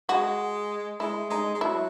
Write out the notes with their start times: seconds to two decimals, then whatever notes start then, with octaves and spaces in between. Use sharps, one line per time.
0.09 G#3 F#4
1.00 G#3 E4
1.30 G#3 D#4
1.55 G#3
1.61 F#3 E4